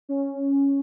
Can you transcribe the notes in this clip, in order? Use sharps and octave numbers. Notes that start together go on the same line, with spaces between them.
C#4